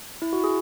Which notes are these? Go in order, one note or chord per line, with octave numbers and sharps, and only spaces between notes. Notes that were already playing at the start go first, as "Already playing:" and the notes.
E4
F#4
G#4